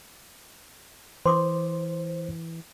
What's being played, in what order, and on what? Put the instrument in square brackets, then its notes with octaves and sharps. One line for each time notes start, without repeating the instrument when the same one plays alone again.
[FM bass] E3 [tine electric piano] C5 [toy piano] C6 D6 D#6